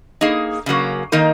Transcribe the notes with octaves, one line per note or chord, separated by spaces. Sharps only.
A#3 D#4 G#4
C#3 F#3 A#3
D#3 A#3 D#4 A#4